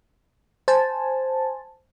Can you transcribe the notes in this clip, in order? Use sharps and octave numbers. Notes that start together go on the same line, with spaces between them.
C5 G#5 A5